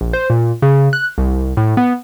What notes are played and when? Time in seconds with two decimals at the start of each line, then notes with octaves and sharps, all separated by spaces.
0.01 A#1
0.13 C5
0.30 A#2
0.62 C#3
0.93 F#6
1.18 C2
1.57 A2
1.77 B3